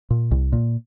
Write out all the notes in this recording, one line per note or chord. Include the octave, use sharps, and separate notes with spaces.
A#2
C2
A#2